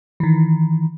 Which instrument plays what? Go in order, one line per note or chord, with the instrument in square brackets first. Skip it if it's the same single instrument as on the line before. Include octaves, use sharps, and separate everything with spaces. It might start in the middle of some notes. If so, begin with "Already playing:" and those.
[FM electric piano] D#3 E3